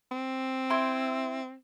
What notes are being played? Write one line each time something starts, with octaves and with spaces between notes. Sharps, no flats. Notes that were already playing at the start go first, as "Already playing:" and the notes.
C4
E4 C6 G6